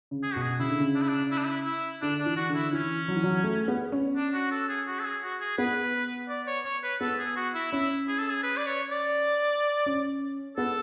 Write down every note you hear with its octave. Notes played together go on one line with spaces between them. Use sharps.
C#3
G#4
B2 F#4
G#4
C#3 E4
D3
C#3
D4
E4
D4
E4
D4
E4
E4
D3 D4
D4
E3
F#4
D3
E4
E3 C#4
F#3
E3
F#3
A3
B3
C#4
D4
F#4
A4
G#4
F#4
A4
G#4
F#4
G#4
B3 B4
D5
C#5
C#5
B4
B3 A4
G#4
F#4
E4
C#4 E4
G#4
A4
G#4
B4
D5
C#5
D5
C#4
B3 A4